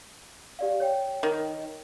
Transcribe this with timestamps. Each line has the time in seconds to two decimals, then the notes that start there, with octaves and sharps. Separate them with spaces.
0.59 G4 D5 F5
0.80 C#5 G5
1.23 D#3